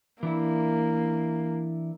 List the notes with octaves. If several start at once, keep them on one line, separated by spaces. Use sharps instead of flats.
E3 A#3 D4 E4